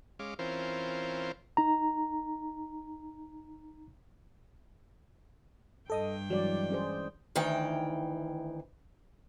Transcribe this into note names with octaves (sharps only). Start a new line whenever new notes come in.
G#3 C#4 F5 D6
E3 C4 C#4 F4 A#4 C5
D#4 A#5
G2 A4 D#5 G5 D#6
E3 F#3 G#3 D5
C#4 G#4 C5
D2 D#3 E3 G5